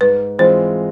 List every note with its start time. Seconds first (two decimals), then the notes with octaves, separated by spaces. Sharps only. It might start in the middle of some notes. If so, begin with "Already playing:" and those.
0.01 G#2 B4
0.39 E3 G#3 C4 F4 C5